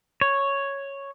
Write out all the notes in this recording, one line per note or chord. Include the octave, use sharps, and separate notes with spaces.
C#5